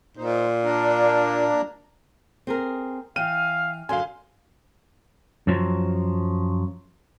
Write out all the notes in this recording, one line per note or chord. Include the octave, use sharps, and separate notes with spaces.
A#2 D#4 C5
A#3 D4 A#4
C4 G#4 A#4
E3 F5 G5 F6 D#7
F#2 D3 F5 G#5 C6
F#2 F3 F#3